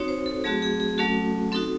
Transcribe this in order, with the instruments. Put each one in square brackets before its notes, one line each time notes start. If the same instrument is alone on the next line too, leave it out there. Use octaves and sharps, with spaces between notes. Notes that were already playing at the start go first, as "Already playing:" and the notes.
Already playing: [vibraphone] C4 D#4 F#4 C#5
C5
A4
F#3 A3 C4 F#4 G#4
G#4
G#4
F#3 A3 C#4 F#4 A4
C4 D#4 F#4 A4